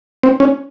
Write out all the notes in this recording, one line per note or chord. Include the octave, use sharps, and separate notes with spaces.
C4
C#4